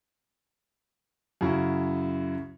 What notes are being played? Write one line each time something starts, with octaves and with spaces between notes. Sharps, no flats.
F#2 C#3 E4 F#4